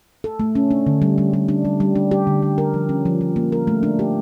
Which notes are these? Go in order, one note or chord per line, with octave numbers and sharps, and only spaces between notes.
A4
A3
C#4
D4
D3
G3
G3
G3
D4
G3
G3
D4
G4
D3
G3
A#4
F3
C#4
F3
F3
A#3
A#4
A3
D4
G4